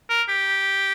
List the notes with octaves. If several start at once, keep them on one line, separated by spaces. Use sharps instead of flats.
A#4
G4